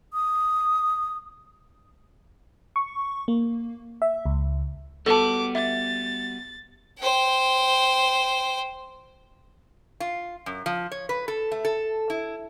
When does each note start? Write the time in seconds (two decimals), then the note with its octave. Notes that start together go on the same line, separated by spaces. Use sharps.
0.13 D#6
2.76 C#6
3.28 A#3
4.02 E5
4.26 C#2
5.06 G3 B3 F#4 A4 A5 D6
5.55 E5 A6
7.00 C5 G5
10.00 F4
10.46 F#2
10.66 F3
10.92 C#5
11.09 B4
11.28 A4
11.52 A3
11.65 A4
12.10 E4